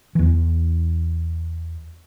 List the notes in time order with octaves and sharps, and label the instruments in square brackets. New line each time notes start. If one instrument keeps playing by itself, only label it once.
[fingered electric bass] E2 E3